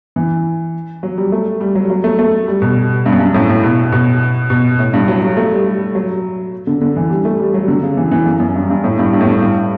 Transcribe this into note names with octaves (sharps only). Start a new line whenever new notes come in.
E3
F#3
G3
A3
G3
F#3
F#3
A3
A3
G3
B2
G2
F#2
G2
A2
A2
B2
B2
B2
A2
G2
F#3
F#3
A3
G3
F#3
D3
D3
E3
G3
A3
G3
F#3
D3
C#3
E3
E3
F#2
F#2
G2
G2
A2
G2
G2
A2
G2
G2